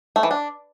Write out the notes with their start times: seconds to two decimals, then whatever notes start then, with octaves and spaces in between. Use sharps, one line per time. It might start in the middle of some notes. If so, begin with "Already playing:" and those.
0.16 A3
0.23 E3
0.31 D4